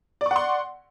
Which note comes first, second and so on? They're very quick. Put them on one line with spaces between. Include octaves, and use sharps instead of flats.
D5 C#6 F#5 C6